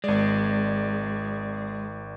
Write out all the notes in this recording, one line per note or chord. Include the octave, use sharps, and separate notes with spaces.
G#1 G#3 D5